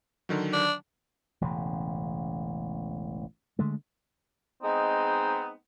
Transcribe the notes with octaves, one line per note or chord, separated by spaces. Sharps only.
D3 D#3 F#3
D4
E1 A1 C#3
D3 G#3 A3
G#3 B3 C4 D#4